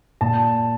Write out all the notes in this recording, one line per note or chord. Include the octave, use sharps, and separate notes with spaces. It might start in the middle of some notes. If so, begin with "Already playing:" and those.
A#2 A5